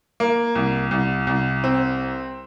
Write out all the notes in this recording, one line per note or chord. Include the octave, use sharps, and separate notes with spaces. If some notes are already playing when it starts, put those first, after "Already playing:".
A#3
C2
C2
C2
C4